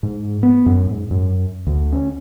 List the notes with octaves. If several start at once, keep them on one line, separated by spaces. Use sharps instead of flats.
G#2
B3
F#2
G#2
F#2
D2
C#4